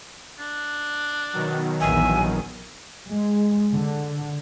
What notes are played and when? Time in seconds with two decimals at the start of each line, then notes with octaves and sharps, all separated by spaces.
0.39 D4
1.33 B2 D#3 F#3
1.81 A#1 E2 E5 G#5
3.08 G#3
3.73 D3